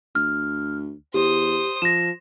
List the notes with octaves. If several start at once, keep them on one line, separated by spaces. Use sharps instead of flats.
D2 F6
E2 G4 C5 D#6
F3 A#6 E7